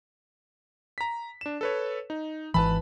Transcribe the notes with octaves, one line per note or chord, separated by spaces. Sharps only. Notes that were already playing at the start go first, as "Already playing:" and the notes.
A#5 B6
D4 E7
A4 B4 C#5
D#4
G#1 E3 B4 A5 B5